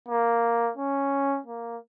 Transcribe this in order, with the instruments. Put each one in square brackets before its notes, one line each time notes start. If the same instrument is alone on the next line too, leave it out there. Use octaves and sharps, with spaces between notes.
[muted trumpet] A#3
C#4
A#3